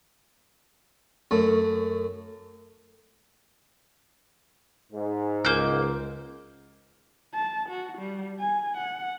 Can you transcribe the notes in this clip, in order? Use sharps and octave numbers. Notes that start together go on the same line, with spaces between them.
F#2 A3
G#2
C#2 A#3 G6
A5
F#4
G3
G#5
F#5